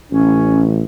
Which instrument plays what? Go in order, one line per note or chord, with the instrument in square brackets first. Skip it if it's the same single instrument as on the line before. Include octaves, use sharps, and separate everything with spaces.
[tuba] A1 [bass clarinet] C#4